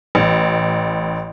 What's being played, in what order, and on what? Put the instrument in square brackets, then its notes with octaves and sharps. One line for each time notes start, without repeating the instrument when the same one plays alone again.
[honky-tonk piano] A1